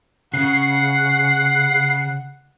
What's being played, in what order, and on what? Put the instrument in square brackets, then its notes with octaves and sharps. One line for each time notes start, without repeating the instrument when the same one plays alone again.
[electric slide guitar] C#3 [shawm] F#5 [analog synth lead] C7